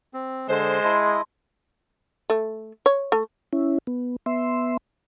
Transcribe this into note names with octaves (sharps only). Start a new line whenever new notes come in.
C4
D3 G#3 C5
E4 D#5 A5 C6
A3
C#5
A3
C#4 E4
B3
B3 E5 C6